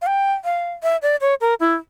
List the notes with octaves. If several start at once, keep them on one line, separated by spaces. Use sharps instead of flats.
F5
G5
F5
E5
D5
C#5
A#4
E4